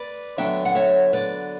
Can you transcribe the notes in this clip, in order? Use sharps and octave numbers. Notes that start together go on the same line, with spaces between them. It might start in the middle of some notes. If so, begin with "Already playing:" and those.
Already playing: B4 D5
D3 F#3 B3 D4 E5 G5
F#5
C#5 E5
B4 D5